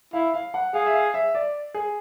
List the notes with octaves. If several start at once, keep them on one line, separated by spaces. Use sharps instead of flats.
E4 F5
F5
F#5
G#4 F5
E5
F5
E5
D5
G#4